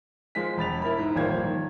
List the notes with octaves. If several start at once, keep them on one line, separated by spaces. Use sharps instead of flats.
F3 G#3 B6
E1 B5 A6 F7
E4 A#4 B5
G#2
D#1 A1 F3 A#3 G#6
D#3